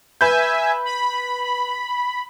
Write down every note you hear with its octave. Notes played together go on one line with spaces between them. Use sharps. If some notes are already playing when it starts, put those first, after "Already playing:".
B4 E5 G#5 G6
B5